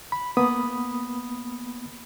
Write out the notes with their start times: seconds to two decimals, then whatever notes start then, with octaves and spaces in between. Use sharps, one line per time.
0.12 B5
0.37 A#3 B3 B5 D#6